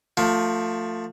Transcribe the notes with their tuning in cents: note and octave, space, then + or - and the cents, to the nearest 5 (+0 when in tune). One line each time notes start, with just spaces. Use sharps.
F3 +15 A3 +30